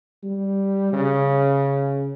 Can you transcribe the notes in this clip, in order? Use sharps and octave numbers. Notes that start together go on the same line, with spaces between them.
G3
C#3